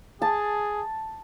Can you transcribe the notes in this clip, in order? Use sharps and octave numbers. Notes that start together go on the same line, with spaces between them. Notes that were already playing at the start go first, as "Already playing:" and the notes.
G#4 A5